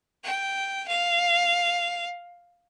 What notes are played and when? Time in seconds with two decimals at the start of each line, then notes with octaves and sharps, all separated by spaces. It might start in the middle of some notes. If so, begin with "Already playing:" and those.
0.24 G5
0.88 F5